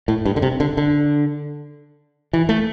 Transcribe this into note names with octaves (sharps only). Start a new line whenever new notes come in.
A2
G2
D3
C3
D3
D3
E3
A3